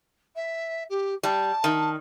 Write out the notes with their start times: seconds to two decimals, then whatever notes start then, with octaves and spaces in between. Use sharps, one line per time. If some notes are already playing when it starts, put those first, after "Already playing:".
0.35 E5
0.89 G4
1.23 G3 A5
1.64 D#3